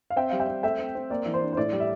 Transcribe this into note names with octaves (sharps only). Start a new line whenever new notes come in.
F5
C4 E5 G5
G3 F5
E5 G5
C4
A3 E5 G5
C4
C4
A#3 D5
E3
C5
D4
C5
A2 D5
G3
E5